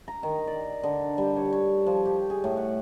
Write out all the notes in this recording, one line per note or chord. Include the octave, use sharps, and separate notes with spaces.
A#5
D#3
D5
D3
G3
C#5
C#5
F3
G4
G#4
A2
F#5